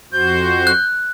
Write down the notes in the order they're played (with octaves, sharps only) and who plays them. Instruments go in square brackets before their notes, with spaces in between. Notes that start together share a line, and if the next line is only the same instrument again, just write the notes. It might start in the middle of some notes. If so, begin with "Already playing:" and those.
[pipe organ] F2 F#4 C5 [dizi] G6
[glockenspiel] F#6